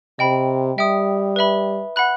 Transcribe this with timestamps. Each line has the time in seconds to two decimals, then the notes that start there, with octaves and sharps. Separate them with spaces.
0.19 C3 D#5 G5 B5
0.78 G3 E5 G5 D#6
1.36 B4 E5 B5
1.96 F#5 B5 F#6